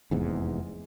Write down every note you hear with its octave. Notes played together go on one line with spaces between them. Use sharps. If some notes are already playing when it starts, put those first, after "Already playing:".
F1 E2 G#2